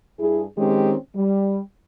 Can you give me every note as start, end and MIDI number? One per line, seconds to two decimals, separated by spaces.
0.20 0.44 43
0.20 0.44 64
0.20 0.44 68
0.58 0.95 51
0.58 0.95 56
0.58 0.95 60
0.58 0.95 61
0.58 0.95 67
1.15 1.60 55